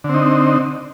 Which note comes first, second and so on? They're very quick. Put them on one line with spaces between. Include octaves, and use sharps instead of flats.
D3 C4 D#4